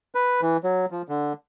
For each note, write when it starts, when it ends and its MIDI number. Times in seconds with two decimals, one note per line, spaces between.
0.15 0.41 71
0.41 0.57 52
0.64 0.86 54
0.91 1.02 53
1.09 1.33 50